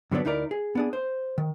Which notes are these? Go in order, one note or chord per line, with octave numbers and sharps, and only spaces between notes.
G2 D3 F#3 A#3 B3 D4
D2 D#4 E4 A#4 D5
G#4
B3 D4 G#4
C5
D#3